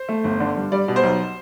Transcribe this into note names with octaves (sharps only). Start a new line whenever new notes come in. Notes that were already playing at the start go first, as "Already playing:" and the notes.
Already playing: C5
A3
G1
D3
G2
G3 D5
B2
C5
B1